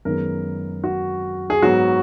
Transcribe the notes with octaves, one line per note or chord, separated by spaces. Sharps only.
F#2 D#3 G#3 B3 A#4
F#4
G#4
G#2 F#3 B3 F#4